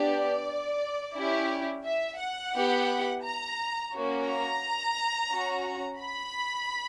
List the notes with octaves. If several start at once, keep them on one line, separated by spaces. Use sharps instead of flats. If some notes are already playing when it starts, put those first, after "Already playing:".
Already playing: B3 D4 G4 D5
C#4 E4 G4
E5
F#5
B3 E4 G4
A#5
A#3 C#4 F#4
A#5
C#4 F#4
B5